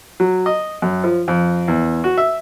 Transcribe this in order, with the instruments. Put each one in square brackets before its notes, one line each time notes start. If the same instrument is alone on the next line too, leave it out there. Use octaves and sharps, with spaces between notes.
[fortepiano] F#3
D#5
F#2
F3
F2
E2
F#4
E5